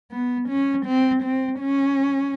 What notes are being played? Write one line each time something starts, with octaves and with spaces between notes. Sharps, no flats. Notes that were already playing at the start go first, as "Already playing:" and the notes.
B3
C#4
C4
C4
C#4